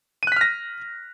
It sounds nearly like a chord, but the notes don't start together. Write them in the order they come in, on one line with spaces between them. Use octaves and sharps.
D#7 F#6 B6 F6 A#6